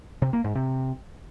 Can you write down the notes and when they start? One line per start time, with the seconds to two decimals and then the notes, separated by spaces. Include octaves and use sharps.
0.22 C3
0.33 A#3
0.44 G#2
0.55 C3